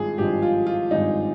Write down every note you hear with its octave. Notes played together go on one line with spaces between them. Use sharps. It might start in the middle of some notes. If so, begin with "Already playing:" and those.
Already playing: G#1 G2 F3 G#3 F4 G#4
G#1 G2 F3 G#3 G4
F4
F4
G#1 G2 F3 G#3 D#4